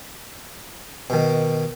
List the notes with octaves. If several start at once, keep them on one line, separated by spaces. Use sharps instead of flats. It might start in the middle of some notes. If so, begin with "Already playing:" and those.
B2 D#3